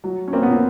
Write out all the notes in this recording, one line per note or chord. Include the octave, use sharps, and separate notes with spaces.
F#3
C#4
A#3 C4
B3
A#2
C4